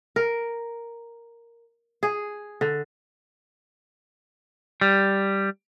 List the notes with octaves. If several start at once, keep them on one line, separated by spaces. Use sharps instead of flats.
A#4
G#4
D3
G3